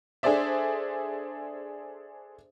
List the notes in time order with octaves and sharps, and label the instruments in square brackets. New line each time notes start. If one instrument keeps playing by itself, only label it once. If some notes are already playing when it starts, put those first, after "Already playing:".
[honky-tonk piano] D4 G#4 A4 C5 D5 E5